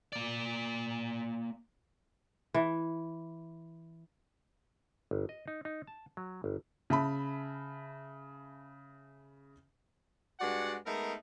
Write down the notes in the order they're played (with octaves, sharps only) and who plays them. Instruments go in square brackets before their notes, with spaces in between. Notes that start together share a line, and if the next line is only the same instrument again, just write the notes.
[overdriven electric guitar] A#3 D5
[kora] E3
[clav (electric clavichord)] G1
D#5
D#4
D#4
A5
F#3
G1
[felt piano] C#3 E5 A5 B5
[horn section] G2 G#3 F#4 D5 F#5
G#3 A3 B3 D#4 A#4